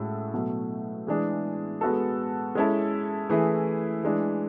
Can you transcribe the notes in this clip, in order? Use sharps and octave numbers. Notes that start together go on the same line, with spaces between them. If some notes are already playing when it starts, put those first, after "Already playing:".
Already playing: A2 G#3 C#4 F#4 A4
B2 F#3 A3
E3 G#3 D4 G#4
G#3 B3 F#4 A4
G#3 C#4 E4 A4
E3 A3 E4 G#4
E3 G#3 D4